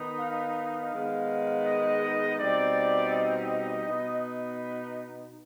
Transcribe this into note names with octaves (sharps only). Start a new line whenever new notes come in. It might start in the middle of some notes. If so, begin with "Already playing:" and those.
Already playing: D#3 B3 D#4
F5
D#3 G#3 B3 D#4
D#5
B2 G3 C4 D#4 D5
D#5
B2 B3 D#4